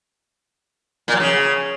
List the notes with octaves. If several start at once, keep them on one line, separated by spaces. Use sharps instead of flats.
A#2
F#3
C#3